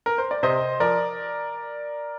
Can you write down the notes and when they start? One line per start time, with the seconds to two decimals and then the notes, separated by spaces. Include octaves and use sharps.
0.06 A#4
0.18 C5
0.31 D5
0.43 C3 C5 D#5
0.80 F3 A#4 D5